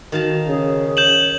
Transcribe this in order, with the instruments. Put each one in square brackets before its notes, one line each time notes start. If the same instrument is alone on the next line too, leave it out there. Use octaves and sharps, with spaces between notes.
[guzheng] D#3 F5 A5 [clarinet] F#4
[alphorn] C#3 [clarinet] G#4
[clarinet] C#5 [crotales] G6 E7 F#7